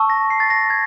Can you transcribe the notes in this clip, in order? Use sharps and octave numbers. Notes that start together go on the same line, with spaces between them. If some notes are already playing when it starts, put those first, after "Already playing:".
Already playing: A5 C#6 E6
A#6
C7
A6
A#6
G#6